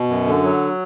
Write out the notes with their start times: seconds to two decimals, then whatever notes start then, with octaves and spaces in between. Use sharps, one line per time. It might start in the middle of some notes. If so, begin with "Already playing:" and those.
Already playing: B2
0.09 F#2
0.26 D3
0.44 F#3